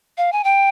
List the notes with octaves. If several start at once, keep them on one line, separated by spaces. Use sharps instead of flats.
F5
G#5
G5